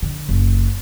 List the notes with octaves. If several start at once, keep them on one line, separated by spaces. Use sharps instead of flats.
D3
F#1